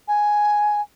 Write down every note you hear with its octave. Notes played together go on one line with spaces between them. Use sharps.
G#5